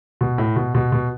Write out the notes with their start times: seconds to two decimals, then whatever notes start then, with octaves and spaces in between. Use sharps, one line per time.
0.21 B2
0.38 A2
0.56 B2
0.75 B2
0.92 B2